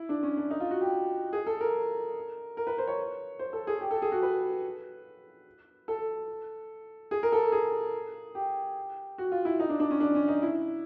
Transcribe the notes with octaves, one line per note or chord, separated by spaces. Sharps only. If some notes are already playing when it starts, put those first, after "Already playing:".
Already playing: E4
D4
C#4
D4
D#4
F4
F#4
G4
G#4
A4
A#4
A#4
B4
C5
C#5
C5
A4
G#4
G4
A4
G#4
F#4
B4
A4
G#4
A#4
A4
G#4
G4
F#4
F4
E4
D#4
D4
D4
C#4
D4
C#4
D#4
E4